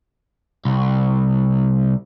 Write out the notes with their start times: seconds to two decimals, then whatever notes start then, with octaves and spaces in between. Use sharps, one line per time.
0.65 C2